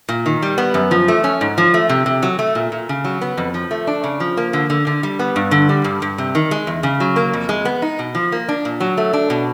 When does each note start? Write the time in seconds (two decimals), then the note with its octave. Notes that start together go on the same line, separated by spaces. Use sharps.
0.09 A#2
0.26 D#3
0.42 G3
0.58 B3
0.74 F#2
0.91 F3
1.08 A3
1.24 C#4
1.41 G#2
1.58 F3
1.74 A3
1.89 C3
2.06 C3
2.22 F#3
2.39 A3
2.55 A#2
2.72 A#2
2.89 C#3
3.05 F#3
3.21 B3
3.38 F2
3.54 F3
3.71 A3
3.87 D4
4.04 C#3
4.20 F3
4.37 A#3
4.53 D3
4.70 D3
4.87 D3
5.03 G3
5.19 B3
5.36 G2
5.51 D3
5.69 G3
5.84 G2
6.02 G2
6.18 C3
6.35 D#3
6.51 G#3
6.67 E2
6.83 C#3
7.00 F#3
7.16 A#3
7.33 F2
7.49 G#3
7.65 B3
7.82 D#4
7.99 B2
8.15 F3
8.32 A#3
8.49 D4
8.65 A#2
8.80 F#3
8.98 A3
9.13 D4
9.30 B2